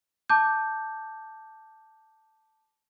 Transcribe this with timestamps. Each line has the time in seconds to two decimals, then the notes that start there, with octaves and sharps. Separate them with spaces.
0.30 A5 D6 G6